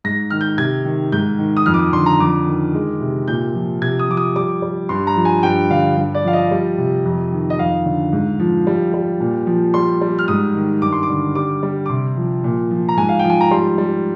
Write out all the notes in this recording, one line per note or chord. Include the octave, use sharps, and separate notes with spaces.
G#2 A#6
D#3 F6
G6
C3 G#6
D#3
G#2 G6
D#3
D#6
F2 F6
D6
D#6
D3 C6
A#5
F2 D6
D#3
G#3
C3
A#2 G6
F3
C3 G#6
D#6
F3 D6
D#6
G3 D6
G3
G2 C6
A#5
F3
G#5
G2 G5
D3 F5
G2
D5
F3 F5
D#5
G3
C3
F2
D#3
D#5
F2 F5
D3
G#2
F3
G3
G3
A#2
F3
G3 C6
G3
F6
G#2 D#6
D#3
G2 D6
C6
D6
D3
G3 D6
G3
D6
C3 C6
F3
A#2
F3
A#5
G#2 G#5
F5
F3 G5
G#5
A#5
G3 C6
G3